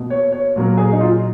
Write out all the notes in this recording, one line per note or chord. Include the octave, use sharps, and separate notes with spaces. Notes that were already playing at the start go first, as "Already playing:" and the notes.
Already playing: B2 A#3
C#5
C#5
A#2 F#3 A#3
G#4
D#4
F4